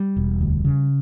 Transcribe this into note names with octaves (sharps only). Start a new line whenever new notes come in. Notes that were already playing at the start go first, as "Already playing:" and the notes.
Already playing: G3
E1
D2
C#3